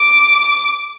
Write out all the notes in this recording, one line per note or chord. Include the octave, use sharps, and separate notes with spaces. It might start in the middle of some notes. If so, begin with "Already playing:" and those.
Already playing: D6